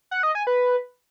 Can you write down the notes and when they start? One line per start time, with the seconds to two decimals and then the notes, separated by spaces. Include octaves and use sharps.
0.11 F#5
0.23 D#5
0.35 G#5
0.47 B4